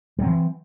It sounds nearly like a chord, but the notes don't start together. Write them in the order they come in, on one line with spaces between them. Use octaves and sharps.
G3 F#3 C4 E3